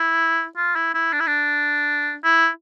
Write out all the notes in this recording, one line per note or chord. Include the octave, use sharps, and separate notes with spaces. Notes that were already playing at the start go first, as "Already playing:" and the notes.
Already playing: E4
F4
E4
E4
D4
E4
D4
E4